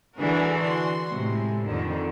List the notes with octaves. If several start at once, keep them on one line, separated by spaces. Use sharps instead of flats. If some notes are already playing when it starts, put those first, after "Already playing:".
D3 E3 D4 F#4 G#4 A#4
F#4 C6
A2 C3 G#3
F2 D3 D#3